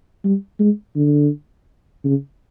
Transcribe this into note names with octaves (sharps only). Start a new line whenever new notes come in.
G3
G#3
D3
C#3